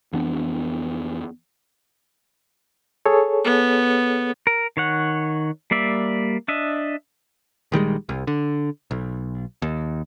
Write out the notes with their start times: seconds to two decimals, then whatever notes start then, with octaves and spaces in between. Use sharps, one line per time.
0.13 F2 E3 B3 D4
3.06 G#4 A4 C#5
3.44 B3
4.47 A#4
4.77 D#3 C#5 F#5
5.71 G3 A#3 D5 E5
6.48 D4 D#5 E5
7.72 A#1 D#3 G3 G#3
8.09 C2
8.27 D3
8.91 B1
9.62 D#2